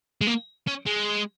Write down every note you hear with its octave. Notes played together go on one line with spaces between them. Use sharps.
G#3
A#3
C#4
G#3